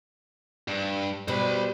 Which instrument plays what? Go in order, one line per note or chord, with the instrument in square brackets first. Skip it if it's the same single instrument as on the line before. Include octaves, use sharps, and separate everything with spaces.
[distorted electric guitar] G2
[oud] B2 [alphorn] G3 [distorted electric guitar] C5 B5